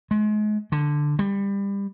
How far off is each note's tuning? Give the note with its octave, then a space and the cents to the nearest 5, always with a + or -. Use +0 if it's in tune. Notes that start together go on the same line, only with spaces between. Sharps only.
G#3 +35
D3 +5
G3 +25